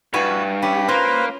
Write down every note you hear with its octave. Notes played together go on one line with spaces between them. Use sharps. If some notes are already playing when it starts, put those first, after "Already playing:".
G2 E4 F#4 B4 G#5
C#4 G4 B5
A#3 F4 B4 C5 A#5 B5